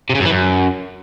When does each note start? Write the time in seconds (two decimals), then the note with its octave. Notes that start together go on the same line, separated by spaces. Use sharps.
0.10 C3
0.15 C#3
0.20 F#2
0.25 E3
0.31 F#2